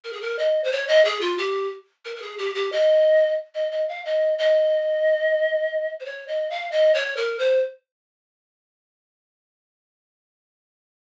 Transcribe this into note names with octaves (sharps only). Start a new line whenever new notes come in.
A#4
G#4
A#4
D#5
C5
C#5
D#5
G#4
F4
G4
A#4
A#4
G#4
G4
G4
D#5
D#5
D#5
F5
D#5
D#5
C5
C#5
D#5
F5
D#5
C#5
A#4
C5